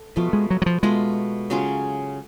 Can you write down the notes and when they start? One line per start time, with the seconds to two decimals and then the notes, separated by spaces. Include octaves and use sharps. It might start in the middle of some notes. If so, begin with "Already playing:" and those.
Already playing: A4
0.16 B2 F3 A3 F4
0.33 G#3
0.50 F#3
0.62 F#3
0.66 F3
0.83 B2 G#3 A3 F4
1.50 C#3 F#3 C#4 F4